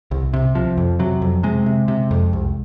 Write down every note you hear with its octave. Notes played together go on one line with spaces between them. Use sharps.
C2
C3
C3 F3
F2
C3 F#3
F2
C3 G#3
C3
C3
F2
C2